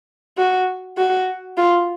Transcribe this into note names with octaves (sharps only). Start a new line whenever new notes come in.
F#4
F#4
F4